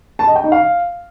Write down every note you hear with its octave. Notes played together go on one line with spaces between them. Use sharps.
A5
D#5
G5
D#4
F5